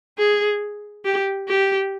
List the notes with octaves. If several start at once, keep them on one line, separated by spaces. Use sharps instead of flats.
G#4
G4
G4